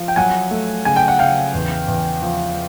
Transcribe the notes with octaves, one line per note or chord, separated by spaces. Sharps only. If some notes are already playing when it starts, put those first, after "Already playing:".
Already playing: F3
G5
F#3 F#5 G#5
A3
C#3 G#5
G5
F#5
C#3 F5 G5
E2
E2
F3